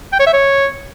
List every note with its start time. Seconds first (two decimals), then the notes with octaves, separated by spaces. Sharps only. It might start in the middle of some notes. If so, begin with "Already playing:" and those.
0.13 G5
0.20 C#5
0.27 E5
0.34 C#5